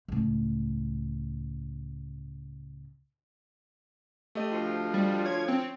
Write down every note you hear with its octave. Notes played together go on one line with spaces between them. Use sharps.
C#2 A2
A3 G4 D#5
D2 F3
G3
C#5 G#6
C4